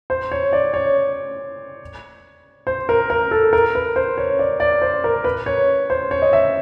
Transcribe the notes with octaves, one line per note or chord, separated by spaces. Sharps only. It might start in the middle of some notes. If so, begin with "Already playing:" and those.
C5
C#5
D5
C#5
C5
A#4
A#4
A4
A#4
B4
C5
C#5
D5
D5
C5
A#4
B4
C#5
C5
C#5
D#5
E5